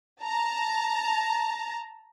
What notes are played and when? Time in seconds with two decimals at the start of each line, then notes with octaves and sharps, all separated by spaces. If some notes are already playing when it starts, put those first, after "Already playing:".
0.23 A5 A#5